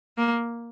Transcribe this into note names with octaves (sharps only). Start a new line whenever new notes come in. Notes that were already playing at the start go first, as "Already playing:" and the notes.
A#3